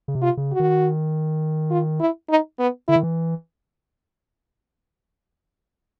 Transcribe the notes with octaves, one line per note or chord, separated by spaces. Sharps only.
C#3
C3
F4
C#3
F#4
D#3
F4
E4
D#4
B3
D3 E4
D#3
E3